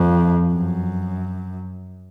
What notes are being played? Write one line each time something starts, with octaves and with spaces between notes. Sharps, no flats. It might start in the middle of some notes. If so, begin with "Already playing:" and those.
Already playing: F2
F#2